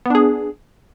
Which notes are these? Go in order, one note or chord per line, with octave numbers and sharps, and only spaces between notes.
B3 D4 G#4